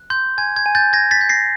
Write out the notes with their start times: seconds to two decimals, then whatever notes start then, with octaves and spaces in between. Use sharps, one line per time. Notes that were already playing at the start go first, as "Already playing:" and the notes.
Already playing: F#6
0.10 C6 G6
0.38 G#5 G#6
0.56 G#6
0.66 G#5
0.75 G6 A6
0.93 G#5 G#6 A#6
1.11 A6 B6
1.21 G6
1.29 A#6 C7